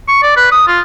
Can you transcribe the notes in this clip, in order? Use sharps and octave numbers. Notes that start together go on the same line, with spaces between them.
C#6
D5
B4
D#6
F4